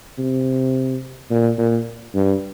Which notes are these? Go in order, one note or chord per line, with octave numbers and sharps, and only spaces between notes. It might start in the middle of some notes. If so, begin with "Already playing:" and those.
C3
A#2
A#2
G2